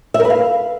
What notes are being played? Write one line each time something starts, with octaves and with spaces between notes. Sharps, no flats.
E5
A#4
B4
F5